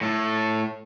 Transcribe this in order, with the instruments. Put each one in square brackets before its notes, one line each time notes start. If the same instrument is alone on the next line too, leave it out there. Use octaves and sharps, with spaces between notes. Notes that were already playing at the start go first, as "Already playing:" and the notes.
[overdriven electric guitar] A2 A4